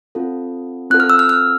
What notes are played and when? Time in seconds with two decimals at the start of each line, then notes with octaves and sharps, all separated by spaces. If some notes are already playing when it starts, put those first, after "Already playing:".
0.15 C4 F4 A4
0.90 C4 F4 A4 F#6
1.00 F6
1.10 E6
1.19 F6
1.29 F6